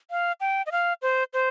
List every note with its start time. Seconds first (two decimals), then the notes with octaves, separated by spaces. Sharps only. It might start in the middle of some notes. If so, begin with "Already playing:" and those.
0.11 F5
0.40 G5
0.66 D#5
0.72 F5
1.02 C5
1.33 C5